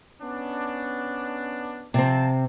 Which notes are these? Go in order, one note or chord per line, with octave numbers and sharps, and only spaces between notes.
B3 C#4 D4
C3 F3 C4 A5